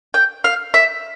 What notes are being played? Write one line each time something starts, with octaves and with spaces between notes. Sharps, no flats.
G5
F5
E5